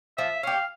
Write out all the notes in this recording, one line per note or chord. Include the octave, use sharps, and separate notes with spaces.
F3 E5
C#4 G4 F5